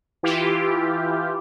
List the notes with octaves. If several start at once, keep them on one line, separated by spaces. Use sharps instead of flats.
E3 E4 F4 G4